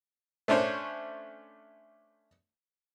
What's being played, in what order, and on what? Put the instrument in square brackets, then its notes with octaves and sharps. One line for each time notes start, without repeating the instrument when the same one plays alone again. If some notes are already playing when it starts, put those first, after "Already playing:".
[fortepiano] A3 C#4 D4 C5 C#5